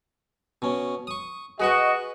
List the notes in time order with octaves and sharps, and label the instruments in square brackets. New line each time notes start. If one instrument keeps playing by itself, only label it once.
[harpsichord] B2 C#4
C#6 D#6
[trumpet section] F#4 D#5 [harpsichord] G#4 B4 C#6